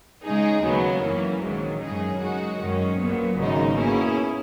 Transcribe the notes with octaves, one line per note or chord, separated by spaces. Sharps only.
C#3 G#3 D#4 G#4
D#2 C#3 F#3 B3
F#2 E3 A#3 C#4
A#1 G#2 D#3 F#3
F#2 C#3 G#3 D#4 G#4
C#3 G#3 D#4 F#4
F#2 D#3 G#3 C#4
A#1 A#2 F#3 B3
G#1 F#2 C#3 G#3 D#4
B2 A#3 C#4 E4 G#4